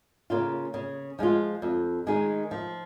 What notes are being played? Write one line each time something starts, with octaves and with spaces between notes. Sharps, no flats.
C#3 A#3 F4
C#3
F3 G#3 F4
F2
D#3 G#3 D#4 G#4
F3